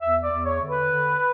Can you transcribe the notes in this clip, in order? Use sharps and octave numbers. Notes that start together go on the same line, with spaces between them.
E2 E5
D5
E2
C#5
D3
B4
D3